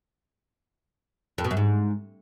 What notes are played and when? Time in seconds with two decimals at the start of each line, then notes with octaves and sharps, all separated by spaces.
1.38 F2
1.44 B2
1.51 F#2
1.57 G#2